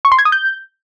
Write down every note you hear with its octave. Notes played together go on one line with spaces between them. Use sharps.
C#6
C6
G#6
D#6
G6